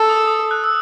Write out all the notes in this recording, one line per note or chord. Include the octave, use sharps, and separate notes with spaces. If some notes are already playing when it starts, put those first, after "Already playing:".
Already playing: A4
D#6
D#6
F#6
E6